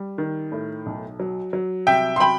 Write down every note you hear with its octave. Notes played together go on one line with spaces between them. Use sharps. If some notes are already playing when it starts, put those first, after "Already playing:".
Already playing: G3
D#3
A2
B1
F#3
F#3
C2 E5 G5
C6
F#3 G5 B5